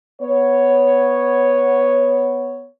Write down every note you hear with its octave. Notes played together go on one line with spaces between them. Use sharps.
B3 C#5